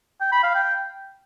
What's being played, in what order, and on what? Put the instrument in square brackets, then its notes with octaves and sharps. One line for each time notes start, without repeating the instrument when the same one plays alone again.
[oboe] G5
B5
F5
G5